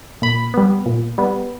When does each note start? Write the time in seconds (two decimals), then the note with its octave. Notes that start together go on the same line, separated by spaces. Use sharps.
0.22 A#2 B5
0.54 G3 B3
0.86 A#2
1.18 G3 B3